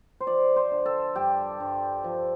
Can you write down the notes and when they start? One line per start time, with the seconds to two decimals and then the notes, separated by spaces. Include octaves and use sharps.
0.20 C5
0.27 F3 D5
0.56 C5
0.71 D3
0.86 A4
1.16 G2 G4
1.60 G2
2.04 F3